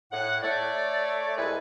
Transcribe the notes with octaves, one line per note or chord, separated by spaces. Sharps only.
A2 F#5
A3 C#5 D5
C2 G#3 E4 A4 B4 G#5